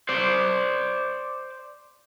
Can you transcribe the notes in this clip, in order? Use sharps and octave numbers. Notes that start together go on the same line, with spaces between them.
C5 D5